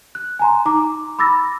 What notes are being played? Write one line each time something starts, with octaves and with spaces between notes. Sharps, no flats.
F#6
G#5 A#5 C6
D#4 A#5 D6
B5 D6 E6 A6 A#6